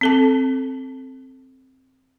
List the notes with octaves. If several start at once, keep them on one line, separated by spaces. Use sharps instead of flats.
C4 A4 A5